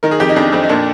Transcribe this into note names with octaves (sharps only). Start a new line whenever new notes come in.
D#3 A#4
G#4
F2 G4
D#4
F2 D4
F2 C4
D#4
A#2 D4